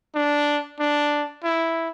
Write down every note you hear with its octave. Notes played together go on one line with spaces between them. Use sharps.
D4
D4
E4